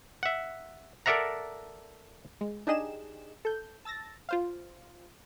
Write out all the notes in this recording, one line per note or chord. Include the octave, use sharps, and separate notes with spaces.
E5 F#5
A4 A#4 D5 E5 F#5 A#5
G#3
D4 D#4 G4 G#4 D#5 E7
A4 G6
A5 E6 A6 A#6
F4 C5 F5